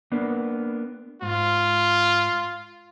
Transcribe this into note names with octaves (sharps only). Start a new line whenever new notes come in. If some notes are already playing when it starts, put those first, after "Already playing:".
A#3 B3 D4
G#2 F4